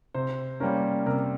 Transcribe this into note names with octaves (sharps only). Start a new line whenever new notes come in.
C3 C5
G3 A#3 C#4 A#4
C3 A#4